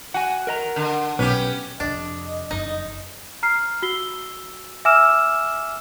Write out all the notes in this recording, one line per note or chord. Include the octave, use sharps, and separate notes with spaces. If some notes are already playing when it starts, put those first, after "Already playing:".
F#4 F#5 G#5
A#4 D#5 A#5
D3
B1 C#4 G4 B4
F2 C3 D4 D#5
F#1 F2 D#4
A#5 F6 C7
F#4 E6 C7 G7
E5 G#5 D6 E6 F6 E7